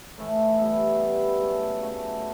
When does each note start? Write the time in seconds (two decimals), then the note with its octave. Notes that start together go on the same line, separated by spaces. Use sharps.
0.18 A2 E3 A3
0.59 G3 B3 E4
0.99 G3 B3 E4
1.40 C#3 F#3 A3
1.81 C#3 F#3 A3